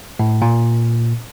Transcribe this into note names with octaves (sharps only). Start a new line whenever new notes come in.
A2
A#2